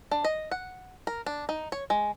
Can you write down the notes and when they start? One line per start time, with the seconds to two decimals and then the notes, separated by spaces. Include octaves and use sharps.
0.11 D4
0.24 D#5
0.51 F#5
1.07 A#4
1.26 D4
1.49 D#4
1.72 C#5
1.90 G#3